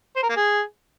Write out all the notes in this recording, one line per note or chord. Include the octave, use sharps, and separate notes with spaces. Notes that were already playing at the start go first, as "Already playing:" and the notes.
C5
A#4
A#3
G#4